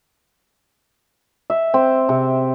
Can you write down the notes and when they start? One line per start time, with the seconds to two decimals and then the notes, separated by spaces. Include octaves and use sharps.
1.50 E5
1.74 C4
2.09 C3